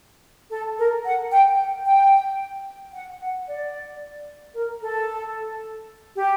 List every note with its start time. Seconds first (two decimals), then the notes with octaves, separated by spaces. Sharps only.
0.51 A4
0.78 A#4
1.05 F#5
1.31 G5
1.86 G5
2.94 F#5
3.21 F#5
3.48 D5
4.55 A#4
4.81 A4
6.16 G4